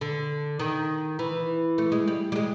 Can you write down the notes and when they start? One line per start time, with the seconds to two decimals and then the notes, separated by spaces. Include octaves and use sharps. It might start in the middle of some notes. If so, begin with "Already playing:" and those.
0.01 D3
0.59 D#3
1.19 E3
1.78 A3
1.92 G#3
2.07 G3
2.32 G3
2.36 G#3